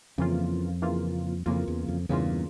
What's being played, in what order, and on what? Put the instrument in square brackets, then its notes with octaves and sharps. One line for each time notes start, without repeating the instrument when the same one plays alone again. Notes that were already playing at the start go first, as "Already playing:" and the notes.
[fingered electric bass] F2 [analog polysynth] C#3 E3 A#3 F4
[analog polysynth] C#3 E3 A#3 F4
[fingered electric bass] F2 [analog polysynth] C#3 E3 A#3 F4
[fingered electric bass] E2
F2
[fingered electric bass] E2 G2 [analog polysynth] C#3 E3 A#3 F4